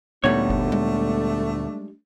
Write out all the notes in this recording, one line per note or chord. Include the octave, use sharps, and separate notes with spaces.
D2 A#2 G3 A3 B3 D4 D#4 C#5
G1
G#3